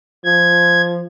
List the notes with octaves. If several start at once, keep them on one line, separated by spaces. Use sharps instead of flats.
F3 G#6